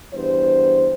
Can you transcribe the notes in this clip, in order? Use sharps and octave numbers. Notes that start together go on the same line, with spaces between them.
E2 G2 C5